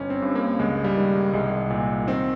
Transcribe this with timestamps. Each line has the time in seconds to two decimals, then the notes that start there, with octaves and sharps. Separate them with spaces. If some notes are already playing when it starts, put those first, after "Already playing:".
Already playing: G1 C#4
0.10 C4
0.22 G2
0.35 A#3
0.59 C#2 G#3
0.84 G3
0.97 D#3
1.33 C2 G#3
1.70 A#2
2.07 D#3 C4